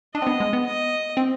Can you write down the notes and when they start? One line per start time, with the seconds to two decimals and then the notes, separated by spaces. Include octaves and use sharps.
0.14 D4 D#5
0.22 C4
0.27 B3
0.40 G#3
0.53 B3
0.66 D#5
1.17 C4